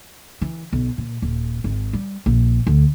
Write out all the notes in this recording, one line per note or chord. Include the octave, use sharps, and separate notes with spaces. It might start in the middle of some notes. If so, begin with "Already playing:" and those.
E3
B1
A#2
D#1
G#1
G3
A#1
D2